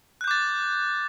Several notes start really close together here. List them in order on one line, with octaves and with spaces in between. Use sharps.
F#6 G6 D6 A6